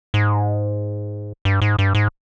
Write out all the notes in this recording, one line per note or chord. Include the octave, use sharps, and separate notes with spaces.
G#2
G2
G#2
G2
G#2